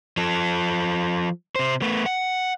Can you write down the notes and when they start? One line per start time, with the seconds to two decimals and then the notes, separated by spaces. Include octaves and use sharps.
0.17 F3 A4
1.56 C3 C5
1.82 A3 B3
2.06 F#5